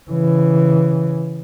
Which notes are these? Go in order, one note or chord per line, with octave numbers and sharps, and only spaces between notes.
C#3 E3